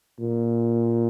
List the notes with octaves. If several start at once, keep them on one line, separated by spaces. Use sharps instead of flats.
A#2